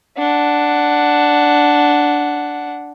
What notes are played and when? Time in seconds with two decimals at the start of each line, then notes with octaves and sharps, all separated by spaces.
0.18 D4 F#5